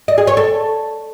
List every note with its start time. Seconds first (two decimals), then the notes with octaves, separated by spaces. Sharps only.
0.08 D#5
0.18 G#4
0.27 C#5
0.37 A4